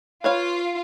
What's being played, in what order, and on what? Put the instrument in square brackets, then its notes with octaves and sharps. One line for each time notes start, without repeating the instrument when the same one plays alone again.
[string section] F4 [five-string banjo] B4 C#5 F5